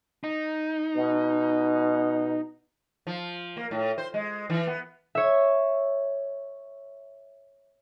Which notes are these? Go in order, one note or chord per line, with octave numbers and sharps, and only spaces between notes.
D#4
B2
F3
A#3
A2
C5
G#3
E3
B3
C#5 E5